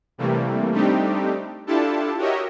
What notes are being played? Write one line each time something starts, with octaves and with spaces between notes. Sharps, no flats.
C3 E3 G3 A3 A#3
G3 A3 C4 D4 D#4 G4
D4 E4 F4 G4 A4 A5
F#4 G4 A#4 C#5 D#5 E5